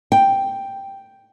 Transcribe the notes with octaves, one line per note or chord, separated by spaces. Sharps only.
G5